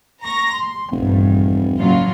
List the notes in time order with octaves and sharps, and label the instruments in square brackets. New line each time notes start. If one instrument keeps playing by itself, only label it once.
[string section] A#5 C#6 A#6
C6
[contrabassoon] F1 [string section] A#1 E2 G2
[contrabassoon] F#1 [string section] A2 F#3 F4